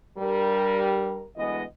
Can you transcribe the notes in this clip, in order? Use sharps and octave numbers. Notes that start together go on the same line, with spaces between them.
G2 G3 A#4
D2 E3 G#3 B3 D#5